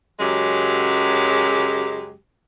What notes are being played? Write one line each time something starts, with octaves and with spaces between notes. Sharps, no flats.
F#2 C#3 F#3 G#3 G4